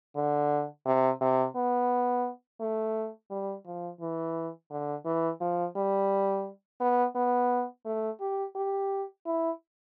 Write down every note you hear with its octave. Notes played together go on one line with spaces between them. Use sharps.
D3
C3
C3
B3
A3
G3
F3
E3
D3
E3
F3
G3
B3
B3
A3
G4
G4
E4